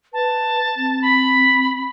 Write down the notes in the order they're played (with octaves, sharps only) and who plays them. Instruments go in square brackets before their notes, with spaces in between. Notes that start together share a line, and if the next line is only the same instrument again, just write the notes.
[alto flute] B4 [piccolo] A5
[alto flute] C4
[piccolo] B5